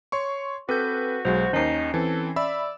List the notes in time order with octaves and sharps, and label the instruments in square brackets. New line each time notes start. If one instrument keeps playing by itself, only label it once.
[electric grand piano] C#5 C6 C#6
[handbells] C4 A4 G6 [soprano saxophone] F#4 [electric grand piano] B4
[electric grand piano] B1 F#3 G#3 [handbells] C5
[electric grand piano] D#2 D#3 [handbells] C#4 C7 [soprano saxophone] D#4
[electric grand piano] E3 C4 [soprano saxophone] A4
[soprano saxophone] D5 [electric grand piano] E5 B5 E6